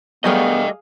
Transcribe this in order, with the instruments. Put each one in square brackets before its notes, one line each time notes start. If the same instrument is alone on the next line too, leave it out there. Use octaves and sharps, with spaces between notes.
[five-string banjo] F#3 G3 A3 [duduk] B3 [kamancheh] G#4 F5 [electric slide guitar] D#5 G5